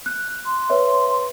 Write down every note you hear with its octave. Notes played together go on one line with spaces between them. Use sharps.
F#6
C6
B4 C#5 E5